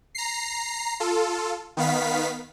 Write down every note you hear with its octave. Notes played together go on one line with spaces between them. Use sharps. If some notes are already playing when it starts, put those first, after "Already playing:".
A#5 C7
F4 A4
D#3 B3 F5 B6